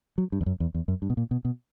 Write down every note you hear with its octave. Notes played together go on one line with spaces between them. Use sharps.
F#3
G2
E2
F#2
E2
E2
F#2
G2
B2
A#2
B2
B2